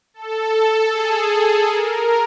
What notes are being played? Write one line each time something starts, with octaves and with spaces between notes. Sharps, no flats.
A4
G#4
A4
A#4